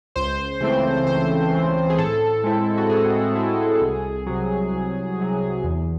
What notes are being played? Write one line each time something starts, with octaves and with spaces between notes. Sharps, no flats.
C#2 C5
C#3 E3 A3 C4
C#2 C5
C#3 E3 A3 C4
G#4
A2 A4
G#3 C4 E4
F#4
A2 G#4
G#3 C4 E4
C2
C3 F#3
C2
C3 F#3
E2